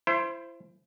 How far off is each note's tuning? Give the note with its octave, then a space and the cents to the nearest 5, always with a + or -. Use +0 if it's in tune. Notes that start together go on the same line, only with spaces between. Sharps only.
E4 +35 C5 +0